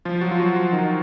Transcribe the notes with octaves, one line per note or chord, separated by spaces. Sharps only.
F3 F4
F#3 F#4
F4
F#3 F#4
F3 F4
D#3 D#4